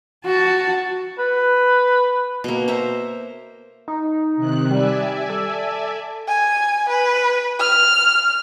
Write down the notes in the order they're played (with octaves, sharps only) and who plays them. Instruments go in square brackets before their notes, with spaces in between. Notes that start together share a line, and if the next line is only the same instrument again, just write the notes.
[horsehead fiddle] F#4 A5
[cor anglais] B4
[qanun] B2 A#3
C5 E5 A#5
[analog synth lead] D#4
[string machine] C3 D#3 F#6
[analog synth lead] G3 [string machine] D5 E5 G#5
[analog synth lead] A4
[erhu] G#5
B4
F6